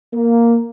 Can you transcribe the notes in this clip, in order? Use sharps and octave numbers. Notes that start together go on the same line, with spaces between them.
A#3